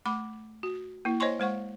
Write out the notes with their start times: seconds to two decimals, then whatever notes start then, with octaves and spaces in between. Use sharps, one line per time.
0.06 A3 B5 D6
0.63 F#4
1.05 A#3 E4
1.20 C5 C#5 D#5 G#5 C6 C#6
1.40 G#3 C5 F#5 C#6